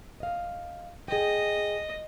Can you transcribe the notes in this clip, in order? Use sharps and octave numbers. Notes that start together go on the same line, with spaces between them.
D#5 F5
G#4 D#5 G5